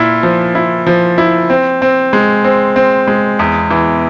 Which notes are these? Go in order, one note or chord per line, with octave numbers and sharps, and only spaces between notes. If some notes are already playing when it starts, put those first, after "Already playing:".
Already playing: A#2 E4
F3
E4
F3
E4
C4
C4
G#3
C4
C4
G#3
E2
E3